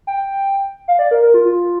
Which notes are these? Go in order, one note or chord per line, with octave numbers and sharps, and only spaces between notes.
G5
F5
D5
A#4
A#4
F4
F4